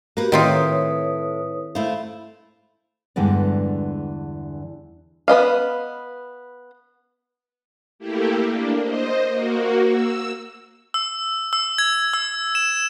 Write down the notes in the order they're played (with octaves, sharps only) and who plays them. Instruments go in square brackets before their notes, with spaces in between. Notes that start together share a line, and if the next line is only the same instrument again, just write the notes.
[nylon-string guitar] A#3 B4 [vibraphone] F#4 G4
[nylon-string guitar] A2 [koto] D#3 C4 F4 [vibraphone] B4 C#5 D#6
[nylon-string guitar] A3 E4 C5 [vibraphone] F5
[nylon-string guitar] E2 G2 D3 E3 G#3 D5
[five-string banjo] B3 B4 D#5 F5
[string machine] A3 A#3 E4 G4
A#3 D4
C5 D#5
A#3 F#4
E6
[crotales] E6
E6
G#6
E6
E7